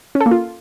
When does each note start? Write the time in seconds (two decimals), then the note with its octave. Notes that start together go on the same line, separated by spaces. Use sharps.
0.15 C#4
0.21 A4
0.26 A#3
0.31 F4